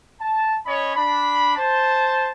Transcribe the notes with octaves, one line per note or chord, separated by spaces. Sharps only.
A5
C#4 C#5 D#5 B5
D4 B5
C5 A5